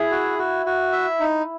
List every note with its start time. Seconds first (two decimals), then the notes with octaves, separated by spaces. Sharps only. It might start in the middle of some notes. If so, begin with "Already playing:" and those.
Already playing: E4 G#4
0.11 F#4
0.38 F#4
0.66 F#4
0.92 E5
1.20 D#4